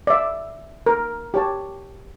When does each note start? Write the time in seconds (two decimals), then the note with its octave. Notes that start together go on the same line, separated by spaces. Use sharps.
0.07 D5 E5
0.86 A#4
1.34 G4 C#5 A5